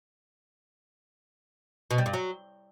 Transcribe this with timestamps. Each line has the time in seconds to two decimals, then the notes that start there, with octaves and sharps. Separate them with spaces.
1.91 B2
1.98 G3
2.06 G2
2.13 F#3